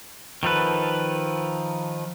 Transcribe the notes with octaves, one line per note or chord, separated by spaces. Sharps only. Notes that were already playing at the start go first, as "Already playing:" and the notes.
D#3 F3 A4 B4